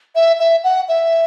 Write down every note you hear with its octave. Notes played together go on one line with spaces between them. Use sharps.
E5
E5
F#5
E5